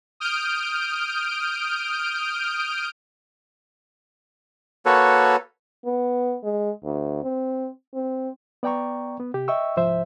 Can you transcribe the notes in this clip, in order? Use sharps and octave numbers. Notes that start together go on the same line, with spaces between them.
D#6 F6 G6 D7
A#3 F#4 A4 B4 C#5
B3
G#3
D2
C4
C4
B3 D5 G5 A#5 C#6
B3
C3 G4
D#5 E5 G5 C#6 E6
C2 G#2 F3 C5 E5